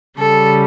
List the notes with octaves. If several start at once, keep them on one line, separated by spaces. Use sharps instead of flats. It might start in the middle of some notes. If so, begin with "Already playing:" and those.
C#3 G3 A4